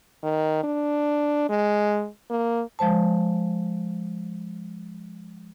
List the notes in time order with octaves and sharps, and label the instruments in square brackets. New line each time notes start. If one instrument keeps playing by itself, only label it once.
[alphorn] D#3
D4
G#3
A#3
[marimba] F3 G#3 C5 A5